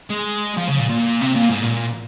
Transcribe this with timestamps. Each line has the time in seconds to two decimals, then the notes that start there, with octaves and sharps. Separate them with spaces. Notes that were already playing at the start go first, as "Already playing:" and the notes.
0.10 G#3
0.57 F3
0.68 C#3
0.79 A#2
0.89 A#2
1.21 C3
1.35 A#2
1.49 G#2
1.63 A#2